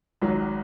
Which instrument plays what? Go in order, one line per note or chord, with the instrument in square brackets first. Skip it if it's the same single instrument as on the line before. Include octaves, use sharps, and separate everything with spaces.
[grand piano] G#1 G#2 F#3